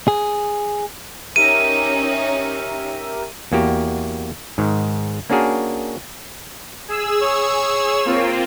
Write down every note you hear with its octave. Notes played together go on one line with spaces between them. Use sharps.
G#4
C#4 D#4 G4 A#4 E5 D#7
E2 A#3 F#4 G4
G#2 D#3
A#3 C#4 D4 F#4 G#4 A#4
G#4 E6
C#5
A#3 C4 F4